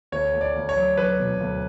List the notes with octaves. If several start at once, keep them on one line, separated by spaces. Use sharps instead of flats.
D2 C#5
D2
D5
D2
C#5
F#3
F#3 B4
E1
D2